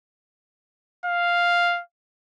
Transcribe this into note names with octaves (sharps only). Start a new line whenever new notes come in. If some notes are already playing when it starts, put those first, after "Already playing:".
F5